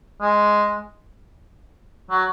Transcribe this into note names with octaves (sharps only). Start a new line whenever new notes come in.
G#3
F#3